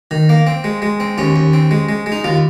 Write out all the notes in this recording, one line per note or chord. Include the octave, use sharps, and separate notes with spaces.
D#3
A#3
C4
G#3
G#3
C4
D#2 C#4
D#2
C4
G#3
G#3
G#3
D#4
D#2 F4